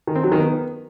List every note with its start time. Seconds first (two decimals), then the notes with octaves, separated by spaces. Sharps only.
0.07 D#3
0.16 C4
0.24 F#3
0.32 D#3
0.40 B3